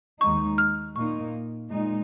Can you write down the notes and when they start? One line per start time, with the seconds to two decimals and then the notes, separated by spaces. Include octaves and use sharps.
0.21 D#2 D#3 G#3 D#4 C#6
0.58 F6
0.95 A#2 A#3 D#4 C#6
1.70 A#2 G#3 D#4